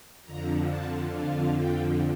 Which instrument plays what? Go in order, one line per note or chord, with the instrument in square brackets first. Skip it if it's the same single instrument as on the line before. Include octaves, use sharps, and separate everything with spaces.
[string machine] F2 D3 F3 A#5
A5
F5
G5